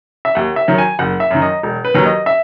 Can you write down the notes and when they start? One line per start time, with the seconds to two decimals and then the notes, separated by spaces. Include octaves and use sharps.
0.25 E5
0.35 D#2 F#5
0.56 E5
0.68 D#3 F#3
0.78 G#5
0.99 F#1 F#5
1.20 E5
1.31 F#2 D#3
1.42 D#5
1.63 E1
1.85 B4
1.94 D#2 D#3 F#3
2.05 D#5
2.26 E5